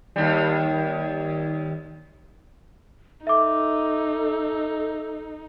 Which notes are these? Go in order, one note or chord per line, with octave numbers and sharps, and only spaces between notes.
D#2 G3
D#4 A4 E5 D6